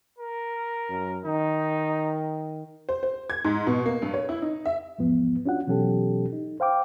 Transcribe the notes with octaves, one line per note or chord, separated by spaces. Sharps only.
A#4
F#2
D#3 D#4
C5
C5
G#6
G#2
B2
A#3
G2
C#5
E4
D#4
E5
E2 G#2 F3 B3
C#4 D4 F4 F#4 F#5
B2 E3 F#3 C#4 G4 A4
D#4
C5 F5 G5 D6